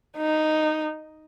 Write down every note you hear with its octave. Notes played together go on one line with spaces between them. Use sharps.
D#4